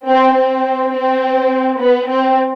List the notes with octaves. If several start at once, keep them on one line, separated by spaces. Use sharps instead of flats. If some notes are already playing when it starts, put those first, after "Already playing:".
C4
C4
C4
B3
C4